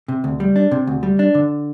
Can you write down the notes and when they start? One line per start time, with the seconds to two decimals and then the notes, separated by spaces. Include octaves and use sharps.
0.08 C3
0.24 D2
0.40 G3
0.56 D4
0.71 C3
0.87 D2
1.03 G3
1.19 D4
1.35 D3